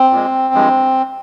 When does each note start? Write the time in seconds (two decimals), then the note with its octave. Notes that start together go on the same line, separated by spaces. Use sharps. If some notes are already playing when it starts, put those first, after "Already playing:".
Already playing: C4
0.11 A#2 G#3
0.54 G2 F3 G#3